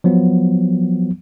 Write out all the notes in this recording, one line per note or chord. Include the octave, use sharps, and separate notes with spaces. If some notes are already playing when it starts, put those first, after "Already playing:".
F3 F#3 B3